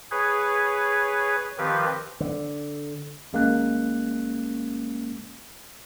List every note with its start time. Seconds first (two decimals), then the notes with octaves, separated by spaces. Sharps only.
0.11 G#4 B4 C#5
1.58 D#3 F3 C4 G4 B4
2.20 D3
3.33 G#1 G#3 A#3 C#4 F#6